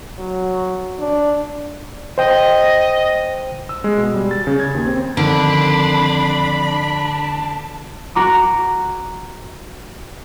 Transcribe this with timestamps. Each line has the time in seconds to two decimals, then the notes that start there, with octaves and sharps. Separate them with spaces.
0.19 F#3
0.99 D4
2.18 C5 D#5 G5
3.69 E6
3.84 G#3
3.98 B2
4.14 G3
4.31 A6
4.47 C#3
4.60 G#6
4.74 D#2
4.86 C4
5.17 F2 D3 D#3 D4 B5
8.15 F#4 A#5 D6